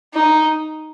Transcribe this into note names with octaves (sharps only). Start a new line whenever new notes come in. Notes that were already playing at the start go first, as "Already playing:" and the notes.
D#4